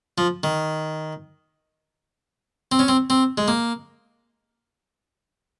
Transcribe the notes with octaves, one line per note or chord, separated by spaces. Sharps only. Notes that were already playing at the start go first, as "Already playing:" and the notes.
F3
D#3
C4
C#4
C4
C4
G#3
A#3